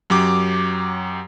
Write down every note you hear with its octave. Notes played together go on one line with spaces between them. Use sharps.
F#2 F#3 G4 D6